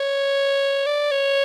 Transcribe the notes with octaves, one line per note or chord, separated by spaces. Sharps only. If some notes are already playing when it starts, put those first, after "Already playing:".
Already playing: C#5
D5
C#5